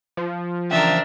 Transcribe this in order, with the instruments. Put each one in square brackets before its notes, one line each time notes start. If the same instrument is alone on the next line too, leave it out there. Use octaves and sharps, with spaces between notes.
[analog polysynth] F3
[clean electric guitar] C#3 E3 G5 [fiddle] D4 A#4 [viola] E5